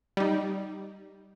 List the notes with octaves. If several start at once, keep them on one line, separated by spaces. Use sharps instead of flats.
G3 D#4